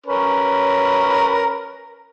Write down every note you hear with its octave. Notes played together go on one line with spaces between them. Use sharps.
C#4 A#4 B4